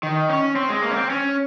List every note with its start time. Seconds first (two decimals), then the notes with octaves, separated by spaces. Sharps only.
0.03 D#3
0.29 C#4
0.56 C4
0.69 G#3
0.82 A#3
0.91 C#4
0.96 C4
1.10 C#4